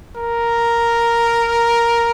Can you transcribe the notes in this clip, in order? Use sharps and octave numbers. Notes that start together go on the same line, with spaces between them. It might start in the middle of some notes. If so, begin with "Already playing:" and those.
A#4